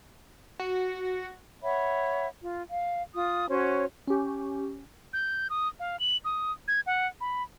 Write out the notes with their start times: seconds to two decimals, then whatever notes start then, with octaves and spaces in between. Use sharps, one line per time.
0.59 F#4
1.63 C#5 E5 F#5 B5
2.42 F4
2.69 F5
3.14 F4 D#6
3.49 C#4 F#4 C5 C#5
4.07 C#4 G4
5.13 G6
5.50 D#6
5.80 F5
6.00 F#7
6.25 D#6
6.68 G#6
6.87 F#5
7.21 B5